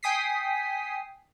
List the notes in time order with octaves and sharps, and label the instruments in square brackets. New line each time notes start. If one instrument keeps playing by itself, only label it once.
[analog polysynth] G5 G#5 D#6 B6 C7